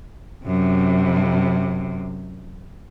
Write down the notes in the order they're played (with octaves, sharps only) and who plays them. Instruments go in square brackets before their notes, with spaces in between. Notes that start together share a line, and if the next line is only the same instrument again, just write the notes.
[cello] F#2 C3